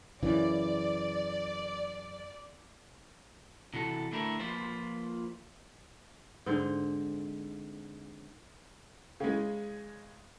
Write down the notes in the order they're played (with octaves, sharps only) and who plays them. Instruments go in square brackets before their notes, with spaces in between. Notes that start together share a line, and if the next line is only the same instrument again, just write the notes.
[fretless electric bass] F#2 C#3 E3 [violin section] D5
[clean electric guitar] C3 E3 F#4 A4
D3 A3 E4 A#4
F3 A#3 F4 B4 C5
[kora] G#2 D3 C4
[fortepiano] C#3 G#3